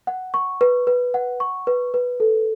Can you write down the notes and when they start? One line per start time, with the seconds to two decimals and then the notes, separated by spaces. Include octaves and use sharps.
0.07 F#5
0.34 C#6
0.61 B4
0.87 B4
1.14 F#5
1.40 C#6
1.67 B4
1.94 B4
2.20 A4